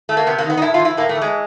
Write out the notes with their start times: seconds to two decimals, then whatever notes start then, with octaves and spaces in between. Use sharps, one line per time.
0.09 A3
0.17 A#3
0.26 C3 B3
0.38 A#3
0.44 D#3
0.50 B3
0.57 D#4
0.61 A2 E4
0.74 F4
0.79 E3
0.85 E4
0.97 A2 A#3
1.09 A3
1.15 E3
1.22 G#3